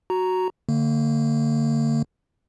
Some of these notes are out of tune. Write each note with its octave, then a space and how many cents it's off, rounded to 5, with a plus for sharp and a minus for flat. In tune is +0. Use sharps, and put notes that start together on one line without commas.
F#4 +0 A#5 +0
D3 +0 A#3 -35